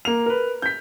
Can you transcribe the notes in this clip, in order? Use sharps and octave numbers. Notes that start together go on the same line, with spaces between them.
A#3 F7
A#4 B4
G6 B6